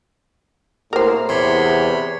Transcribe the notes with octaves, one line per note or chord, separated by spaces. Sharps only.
A2 A#3 A#4 C5
E2 C3 C#5 B5 C6